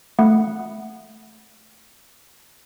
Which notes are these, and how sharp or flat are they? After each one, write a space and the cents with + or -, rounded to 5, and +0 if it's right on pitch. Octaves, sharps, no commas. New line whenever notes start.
A3 +0 F#5 +0